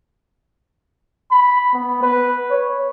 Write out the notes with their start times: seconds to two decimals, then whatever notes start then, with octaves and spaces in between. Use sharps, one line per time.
1.31 B5
1.74 B3
2.02 B4
2.51 C#5